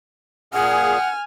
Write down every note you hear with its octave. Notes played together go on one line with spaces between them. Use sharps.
A#2 G#4 F#5 G#5 F6